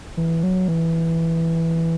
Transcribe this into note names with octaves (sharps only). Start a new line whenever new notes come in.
E3
F#3
E3